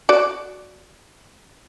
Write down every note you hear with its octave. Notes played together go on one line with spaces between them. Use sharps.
F#4 D5